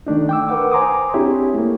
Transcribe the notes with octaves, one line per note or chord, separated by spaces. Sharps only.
D#3 A3 D4 D#4
G5 D6 E6
A#4 B4 F#5 D6
C5 G#5 A#5 C6 D6 D#6
C4 D4 E4 G4 G#4 C#5
A3 A#3